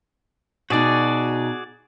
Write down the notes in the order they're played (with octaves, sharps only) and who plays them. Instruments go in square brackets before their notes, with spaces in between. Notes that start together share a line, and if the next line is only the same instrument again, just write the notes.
[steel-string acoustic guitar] B2 D#4 [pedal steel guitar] F#4 G#4 D5